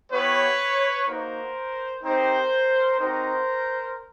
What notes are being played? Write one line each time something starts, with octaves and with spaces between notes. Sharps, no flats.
B3 E4 G4 B4 C#5
A#3 D#4 F#4 A#4 C5
C4 D#4 G4 A#4 C5
C4 D#4 F#4 A#4 C5